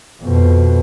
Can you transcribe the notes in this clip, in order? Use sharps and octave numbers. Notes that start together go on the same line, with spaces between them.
F2 B2